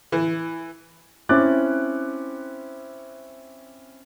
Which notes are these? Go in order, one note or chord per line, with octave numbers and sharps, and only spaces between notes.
E3
C4 C#4 E4 D6 F#6 A6